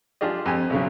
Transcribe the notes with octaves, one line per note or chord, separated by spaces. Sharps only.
D4 F4 G4 G#4 D#5
F2 G4 G#5
B1 C#3 F#3